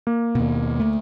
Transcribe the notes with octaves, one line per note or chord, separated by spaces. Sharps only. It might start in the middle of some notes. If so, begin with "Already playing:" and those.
A#3
D#2 B2
D2 A3